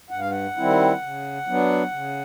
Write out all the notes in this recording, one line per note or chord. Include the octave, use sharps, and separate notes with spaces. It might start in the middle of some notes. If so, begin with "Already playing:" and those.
G2 F#5
F5
F#5
D#3 G3 C4 E4
C#3
F#3 B3 D4
C#3